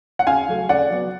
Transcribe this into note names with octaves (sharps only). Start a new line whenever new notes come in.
F#5
C#3 F5 G#5
F#3 A3
C#3 D5 F#5
F#3 B3